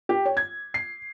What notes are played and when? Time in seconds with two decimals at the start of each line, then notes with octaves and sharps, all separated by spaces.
0.09 G4
0.25 C#5
0.37 G#6
0.74 C7